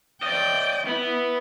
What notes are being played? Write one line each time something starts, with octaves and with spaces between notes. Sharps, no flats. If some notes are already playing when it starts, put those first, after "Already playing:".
D5 D#5 G5
B3 E4